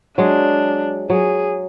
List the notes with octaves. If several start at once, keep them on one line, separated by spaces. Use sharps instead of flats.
F#3 G#3 D4
F#3 G#4